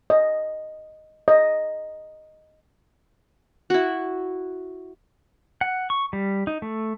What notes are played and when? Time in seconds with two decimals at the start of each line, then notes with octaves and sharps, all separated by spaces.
0.10 D#5
1.28 D#5
3.70 E4 F#4
5.61 F#5
5.90 C#6
6.13 G3
6.47 D#4
6.62 A3